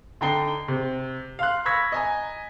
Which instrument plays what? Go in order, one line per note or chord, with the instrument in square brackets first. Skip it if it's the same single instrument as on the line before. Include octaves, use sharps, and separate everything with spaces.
[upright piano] D3 D#4 G5 A#5 C7 G7
C3
F5 C6 F#6
B5 C#6 E6 G#6 A#6 B6
D#5 G#5 A#5